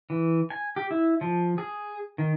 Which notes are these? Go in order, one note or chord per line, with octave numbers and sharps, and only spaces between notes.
E3
G#5
G4
E4
F3
G#4
D#3